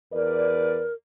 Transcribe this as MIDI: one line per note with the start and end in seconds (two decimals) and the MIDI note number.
0.13 0.85 40
0.13 0.93 70
0.13 0.85 71
0.13 0.85 74